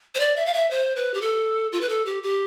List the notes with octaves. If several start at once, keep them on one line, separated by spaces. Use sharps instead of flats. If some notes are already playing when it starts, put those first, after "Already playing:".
C5
D5
E5
F5
E5
C5
B4
G4
A4
F4
B4
A4
G4
G4